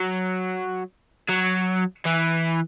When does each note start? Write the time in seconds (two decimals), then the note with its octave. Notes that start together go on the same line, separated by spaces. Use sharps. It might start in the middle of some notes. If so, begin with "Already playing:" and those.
Already playing: F#3
1.29 F#3
2.05 E3